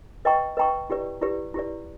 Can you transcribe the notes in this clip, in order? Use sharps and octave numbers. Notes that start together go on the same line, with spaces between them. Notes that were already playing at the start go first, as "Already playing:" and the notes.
B4 D#5 G5 A#5 C#6
B4 D#5 G5 A#5 C#6
E4 G4 B4 D5
E4 G4 B4 D5
E4 G4 B4 D5